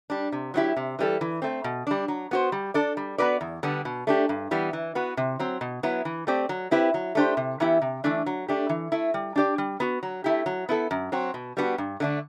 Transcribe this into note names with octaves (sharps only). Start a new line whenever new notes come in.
G3 D4
C3
F#3 C4 E4 G4
C3
E3 G3 D4 A4
E3
A3 C4
B2
G3 D4
F#3
B3 F#4 C5
G3
D4 A4 D5
G3
B3 F#4 B4 D5
E2
D3 G3 B3 D4
B2
A3 D4 G4
G2
E3 G3 B3
E3
B3 F#4 B4
C3
F#3 C4
B2
F#3 B3 E4
E3
A3 C4 G4 D5
F#3
C4 E4 G4 B4
F#3
A3 D4 G4 C5
C3
E3 B3 E4 G4
C3
E3 A3 D4
F#3
A3 D4 G4
E3
A3 E4
G3
D4 G4 D5
G3
B3 F#4
F#3
A3 E4 G4
F#3
B3 E4 A4
F#2
F#3 C4 F#4
B2
G3 B3 D4 F#4
G2
D3 A3 D4